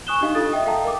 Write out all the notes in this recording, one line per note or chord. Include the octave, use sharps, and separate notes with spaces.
G#5 C#6 D#6 F#6 E7 G7
D4 D#4 G4 D#5 F5
F4 A4 D#6 A6
D#5 E5 G5 D#6
A4 F5 G5 A5 A#5
A#4 D6